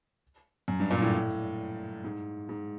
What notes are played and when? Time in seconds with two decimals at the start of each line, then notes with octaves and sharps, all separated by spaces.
0.68 F#2
0.80 G2
0.91 A#2
1.02 A2
2.04 G#2
2.49 G#2